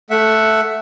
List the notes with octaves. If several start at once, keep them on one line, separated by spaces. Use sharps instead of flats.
A3 E5 F#5